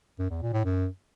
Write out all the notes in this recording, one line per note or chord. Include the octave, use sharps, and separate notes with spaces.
F#2
E2
A#2
A2
F#2